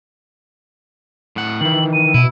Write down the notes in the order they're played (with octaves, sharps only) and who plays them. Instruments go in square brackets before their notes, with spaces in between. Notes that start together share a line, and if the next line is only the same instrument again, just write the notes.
[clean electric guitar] A2 F#5
[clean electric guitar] D#3 E3 [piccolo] F#7
[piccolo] D#7
[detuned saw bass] B2 [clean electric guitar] E4